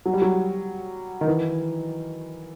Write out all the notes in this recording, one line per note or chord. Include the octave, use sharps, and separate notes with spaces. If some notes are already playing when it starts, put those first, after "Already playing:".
F#3
G3
F#3
D#3
E3